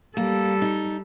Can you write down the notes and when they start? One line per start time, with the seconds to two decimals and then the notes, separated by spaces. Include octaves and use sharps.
0.17 G3 A#3 A4
0.62 D#4